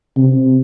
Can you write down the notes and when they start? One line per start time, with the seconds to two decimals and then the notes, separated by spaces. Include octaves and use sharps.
0.17 C3